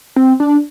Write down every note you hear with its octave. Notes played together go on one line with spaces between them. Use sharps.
C4
D4